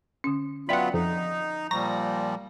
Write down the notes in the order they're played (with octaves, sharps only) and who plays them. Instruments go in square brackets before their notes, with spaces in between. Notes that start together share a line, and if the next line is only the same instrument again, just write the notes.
[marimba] D3 C#4
[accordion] F#3 B3 F4 [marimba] D5 E5 G5 [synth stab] F#5 B5
[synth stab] F2 [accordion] D#4
[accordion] A#2 F3 G3 [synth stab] A#5 A#6 [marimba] C#6